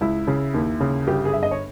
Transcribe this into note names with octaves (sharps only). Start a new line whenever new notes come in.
C#2 E4
C#3
D#2
C#3
G1 G4
G#4
G1 E5
D#5
C#5